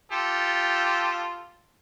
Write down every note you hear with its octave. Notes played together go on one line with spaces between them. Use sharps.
F4 G4 A4